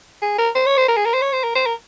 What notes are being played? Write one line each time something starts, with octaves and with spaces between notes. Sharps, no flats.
G#4
A#4
C5
C#5
C5
A#4
G#4
A#4
C5
C#5
C5
A#4
C5
A#4